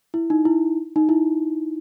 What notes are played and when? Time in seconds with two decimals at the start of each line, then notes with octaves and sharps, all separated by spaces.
0.14 E4
0.30 D#4
0.45 E4
0.96 D#4
1.09 E4